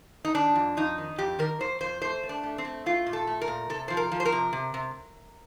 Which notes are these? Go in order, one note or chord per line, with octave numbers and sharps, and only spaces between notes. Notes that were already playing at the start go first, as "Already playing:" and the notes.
D#4
D#3 D4
F2
F2 D#4
D#3
F2 G4
D#3 A#4
F2 C5
F2 C5
A3 C5
A3
D4
A3
C4
A3
A3 F4
A#2
A4
A3
A#4
A#2
C3 A4
F3 C5
A#4
F3
C5
A#4
C3
C3
C3